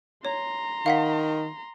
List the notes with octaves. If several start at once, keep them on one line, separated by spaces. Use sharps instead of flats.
C#5 A#5 C6
D#3 F5 F#5 B6